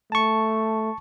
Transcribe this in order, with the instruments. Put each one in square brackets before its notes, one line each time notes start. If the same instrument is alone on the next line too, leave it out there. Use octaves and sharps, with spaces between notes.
[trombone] A3 [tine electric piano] A5 C#6